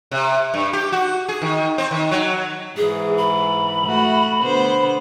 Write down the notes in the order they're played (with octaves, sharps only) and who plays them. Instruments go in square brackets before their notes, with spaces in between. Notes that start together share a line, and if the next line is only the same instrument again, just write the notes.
[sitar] C3
G2
G4
F#4
G#4
D#3
C4
D#3
F#3
[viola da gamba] G#2 E3 [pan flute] G#4
[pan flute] B5
[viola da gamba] A3 F#4
D3 B3 C5